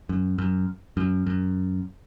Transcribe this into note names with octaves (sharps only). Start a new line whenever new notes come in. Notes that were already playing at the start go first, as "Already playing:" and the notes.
F#2
F#2
F#2
F#2